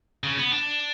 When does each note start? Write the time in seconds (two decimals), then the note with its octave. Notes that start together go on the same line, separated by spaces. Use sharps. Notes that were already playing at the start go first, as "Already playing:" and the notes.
0.24 C#3
0.38 B3
0.53 D4